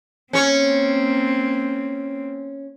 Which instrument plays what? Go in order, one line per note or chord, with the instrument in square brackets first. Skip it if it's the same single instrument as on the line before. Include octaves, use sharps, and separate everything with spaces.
[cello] A#3 C4 [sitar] C#4 C#5